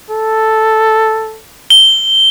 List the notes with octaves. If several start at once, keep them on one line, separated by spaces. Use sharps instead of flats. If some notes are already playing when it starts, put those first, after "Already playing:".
A4
G7